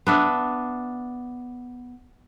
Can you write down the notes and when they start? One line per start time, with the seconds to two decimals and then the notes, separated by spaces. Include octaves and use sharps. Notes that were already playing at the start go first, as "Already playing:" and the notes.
0.07 B3 D4 E5